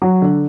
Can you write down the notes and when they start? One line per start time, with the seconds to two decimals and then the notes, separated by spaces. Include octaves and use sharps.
0.02 F#3
0.22 D3